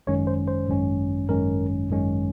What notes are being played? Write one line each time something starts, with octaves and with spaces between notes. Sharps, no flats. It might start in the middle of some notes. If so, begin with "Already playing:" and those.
G#1 F#2 D#3 G#3 C#4 C#5
C5
C5
G#1 F#2 D#3 G#3 C#4
G#1 F#2 D#3 G#3 C#4 A#4
G#1 F#2 D#3 G#3 C#4